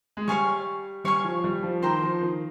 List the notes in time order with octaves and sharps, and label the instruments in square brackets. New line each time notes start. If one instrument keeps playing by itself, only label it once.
[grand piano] G#3
[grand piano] G3 [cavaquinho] C#5 F5 G#5 C#6
[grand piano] G3 [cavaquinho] C#5 F5 G#5 C#6
[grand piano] F3
G3
F3
[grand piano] D#3 [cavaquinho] C5 G5 A#5
[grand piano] F3
D#3